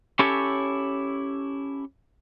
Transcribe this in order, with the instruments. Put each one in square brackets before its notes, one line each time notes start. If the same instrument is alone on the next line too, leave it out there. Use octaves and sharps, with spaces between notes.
[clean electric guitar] C#4 E4 G4 A4 C#5